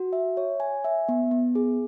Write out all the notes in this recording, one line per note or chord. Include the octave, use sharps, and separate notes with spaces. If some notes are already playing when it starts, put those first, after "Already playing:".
Already playing: F#4
E5
C#5
G#5
E5
B3
B3
G#4